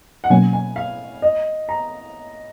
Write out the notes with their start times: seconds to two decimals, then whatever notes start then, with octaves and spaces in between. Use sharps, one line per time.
0.24 F#5
0.30 B2 F#3 A#3 C#4 G#5
0.53 G#5
0.76 F5
1.22 D#5
1.69 A#5